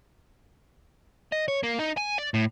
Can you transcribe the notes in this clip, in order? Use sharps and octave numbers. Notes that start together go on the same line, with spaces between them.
D#5
C#5
A#3
D#4
G#5
D5
A2